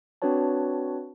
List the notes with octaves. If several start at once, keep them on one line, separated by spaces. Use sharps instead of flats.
C4 D4 F#4 B4 C#5 A5